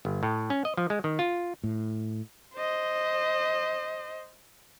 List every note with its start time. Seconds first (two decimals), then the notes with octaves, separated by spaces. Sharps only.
0.05 G1
0.23 A2
0.50 C#4
0.65 D#5
0.77 F3
0.90 G#3
1.04 D#3
1.19 F4
1.64 A2
2.55 C5 D#5